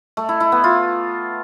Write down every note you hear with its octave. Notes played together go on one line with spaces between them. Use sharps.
A3
E4
E4
B3
F4